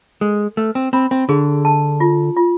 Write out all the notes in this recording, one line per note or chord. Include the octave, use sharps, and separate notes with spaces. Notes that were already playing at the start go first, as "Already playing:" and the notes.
G#3 A4
A3 B4
C4
C4 B5
C4
D3 G#4
A5
F4
F4